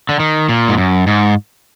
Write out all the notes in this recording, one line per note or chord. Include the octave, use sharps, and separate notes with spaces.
D3
D#3
A#2
G#2
F#2
G#2